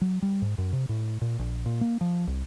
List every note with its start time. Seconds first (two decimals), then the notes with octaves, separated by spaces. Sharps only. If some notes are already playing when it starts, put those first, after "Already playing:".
0.01 F#3
0.22 G3
0.42 G#2
0.58 F#2
0.73 C3
0.89 A2
1.21 A#2
1.39 A#1
1.66 A#2
1.81 A#3
2.01 F3
2.27 C2